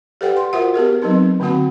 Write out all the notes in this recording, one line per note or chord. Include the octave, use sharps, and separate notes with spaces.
G4 A4 B4 D5 F#5 G5
C6
F4 F#4 A#4 C5 E5 F#5
B3 G4 G#4 A#4
F#3 B3 C4 D#4 B4
D3 A#3 C4 F#4 F#5